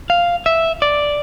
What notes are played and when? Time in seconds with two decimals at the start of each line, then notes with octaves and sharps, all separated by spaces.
0.10 F5
0.46 E5
0.82 D5